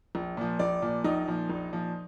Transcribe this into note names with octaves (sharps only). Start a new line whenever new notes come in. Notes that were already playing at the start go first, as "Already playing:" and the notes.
A#1
A#2 F3
A#1 D5
A#2 F3
A#1 D#4
A#2 F3
A#1
A#2 F3